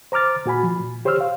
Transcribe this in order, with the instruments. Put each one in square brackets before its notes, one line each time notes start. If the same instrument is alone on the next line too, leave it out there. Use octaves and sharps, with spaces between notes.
[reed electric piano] C5 A#5 D6 F6 A6
A#2 F#4 G#5 B5
F3
A#2
G4 C5 C#5 C6 E6 F6
F5